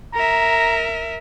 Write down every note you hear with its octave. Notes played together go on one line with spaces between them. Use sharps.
A#4 E5 A#5